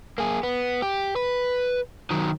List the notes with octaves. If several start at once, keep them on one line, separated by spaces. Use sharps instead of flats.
A#3 G#4
B3
G4
B4
D#3 F#3